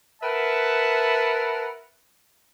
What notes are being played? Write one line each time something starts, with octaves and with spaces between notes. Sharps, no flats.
A#4 B4 E5 F#5 A5